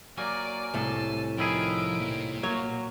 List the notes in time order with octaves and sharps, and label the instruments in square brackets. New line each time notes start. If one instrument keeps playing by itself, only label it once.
[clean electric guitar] F#3 A#3 [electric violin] D5 D6 [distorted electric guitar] G#5
[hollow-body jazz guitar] C2 A2 [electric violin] A5
[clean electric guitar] D#3 E4 G#4 [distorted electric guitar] F3 [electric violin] D7
[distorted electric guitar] A#2
[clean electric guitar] F#3 [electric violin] A#3 [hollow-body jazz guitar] C#5